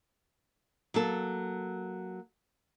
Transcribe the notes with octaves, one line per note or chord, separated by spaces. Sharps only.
F#3 A#3 A4